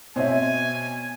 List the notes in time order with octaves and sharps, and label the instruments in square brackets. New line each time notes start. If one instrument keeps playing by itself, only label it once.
[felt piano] B2 C4 [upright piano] C#5 E5 [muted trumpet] G#5